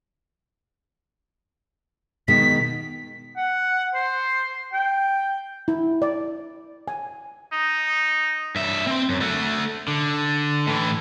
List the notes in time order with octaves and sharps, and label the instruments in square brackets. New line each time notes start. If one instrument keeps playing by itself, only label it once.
[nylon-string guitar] B2 D#3 G#3 [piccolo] B6
[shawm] F#5
C5
G5
[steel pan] E4
D5
G#5
[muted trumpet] D#4
[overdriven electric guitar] G2 E5
C4 C6
F#2
A3 F#4
D3
A2 E3